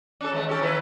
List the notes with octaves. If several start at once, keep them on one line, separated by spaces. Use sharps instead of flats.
C#4 A4
D#3 G#3 A3
C#4 G4 A4
D#3 E4 B4